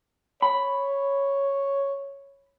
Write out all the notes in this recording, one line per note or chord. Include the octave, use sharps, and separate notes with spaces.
C#5 B5